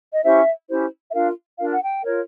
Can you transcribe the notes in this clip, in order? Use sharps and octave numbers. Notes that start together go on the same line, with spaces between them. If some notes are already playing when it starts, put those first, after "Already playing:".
D#5
C#4 E4 G4 C5 E5
C#4 E4 G4 C5
E5
D4 F4 A#4 F5
D4 F4 A#4 F5
F#5
G5
F4 A#4 C#5